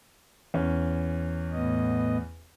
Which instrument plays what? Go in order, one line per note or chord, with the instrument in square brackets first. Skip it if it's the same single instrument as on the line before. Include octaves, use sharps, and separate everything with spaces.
[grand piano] E2 C#4
[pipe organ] A2 B3 D#5